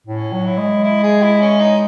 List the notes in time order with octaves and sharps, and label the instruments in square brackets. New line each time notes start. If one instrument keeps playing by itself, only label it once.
[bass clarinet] A2 [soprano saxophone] C#4
[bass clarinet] F#3
[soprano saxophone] E4
[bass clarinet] G#3
[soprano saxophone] E4
G#4
E4
C#4
D#4